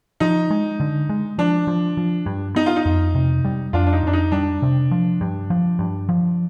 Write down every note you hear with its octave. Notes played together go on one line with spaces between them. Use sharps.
F3 D#4
G#3
D3
G#3
F3 D4
F3
F3
G2
B3 D#4
F4
D#4
F2
C3
G3
F2 D4 F4
D4
D#4
F2 D4
D#4
G3 D4
C3
F3
G2
F3
G2
F3